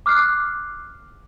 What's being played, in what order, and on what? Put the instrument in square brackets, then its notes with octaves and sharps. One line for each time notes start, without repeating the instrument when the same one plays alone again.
[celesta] D6 F6 F#6 C7